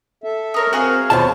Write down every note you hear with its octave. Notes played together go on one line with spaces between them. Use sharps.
A4 E5
D#4 A#4 C#5
C4 F#4 G#4 F5
D#2 B2 F4 C5 C#5 A5